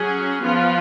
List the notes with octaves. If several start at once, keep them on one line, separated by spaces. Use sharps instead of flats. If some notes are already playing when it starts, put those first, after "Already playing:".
Already playing: F#3 C#4 G#4
F3 B3 F4